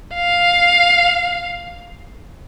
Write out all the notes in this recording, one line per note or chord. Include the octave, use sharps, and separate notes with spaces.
F5